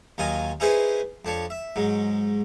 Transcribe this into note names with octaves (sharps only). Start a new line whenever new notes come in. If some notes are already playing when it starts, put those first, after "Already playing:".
D#2 F#3 F4 D#5 G#5
C#4 D#4 E4 G#4 B4 C5
F2 D4 C#5
E5
G#2 F#3